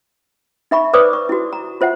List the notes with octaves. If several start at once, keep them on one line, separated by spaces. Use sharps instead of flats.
D#4 E5 B5 C#6
B4 C5 D5 D6 D#6
C#6
E4 F#4
A#5
F4 C5 E5 F#5